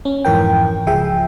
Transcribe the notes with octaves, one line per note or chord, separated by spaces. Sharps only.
C#4
F2 G#2 E3 A#4 G5
C#2 F3 G#4 E5 G5